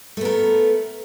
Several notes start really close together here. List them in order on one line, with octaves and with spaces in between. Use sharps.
A3 B3 A#4